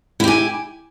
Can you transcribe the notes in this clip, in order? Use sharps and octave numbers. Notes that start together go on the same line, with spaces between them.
E4 G4 G#5